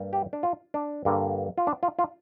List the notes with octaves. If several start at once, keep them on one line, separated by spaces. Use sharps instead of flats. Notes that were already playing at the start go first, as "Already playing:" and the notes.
Already playing: G2 G3 A#3 D4
G4
D4
F4
D4
G2 D3 A#3 D4
F4
D4
F4
F4